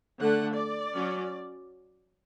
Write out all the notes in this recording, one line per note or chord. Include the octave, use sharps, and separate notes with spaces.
D3 A3 D4 F#5
D5
F#3 C#4